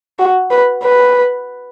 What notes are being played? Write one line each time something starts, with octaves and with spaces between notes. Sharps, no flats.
F#4
B4
B4